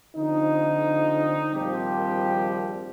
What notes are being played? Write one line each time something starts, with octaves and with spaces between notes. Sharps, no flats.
D3 F3 C4 D#4
A#1 D#3 F3 G3 C4 G4